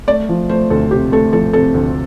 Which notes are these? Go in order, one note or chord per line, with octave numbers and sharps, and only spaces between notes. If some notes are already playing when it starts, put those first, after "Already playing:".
A3 D5
F3
A3 C5
D2 A4
C3 G4
A3 A4
F3 A4
C3 A4
D2